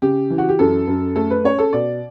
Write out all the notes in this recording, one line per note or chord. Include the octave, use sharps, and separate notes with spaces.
C#3 G4
E3
F#4
G4
F#2 A4
F#2
A3 A4
B4
C#4 C#5
A4
B2 D5